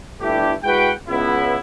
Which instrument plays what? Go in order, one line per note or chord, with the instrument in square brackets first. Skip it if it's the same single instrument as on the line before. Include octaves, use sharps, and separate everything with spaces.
[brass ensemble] G1 A3 D4 E4 G4
G#3 E4 F#4 B4 F#5 G5
C#2 B3 E4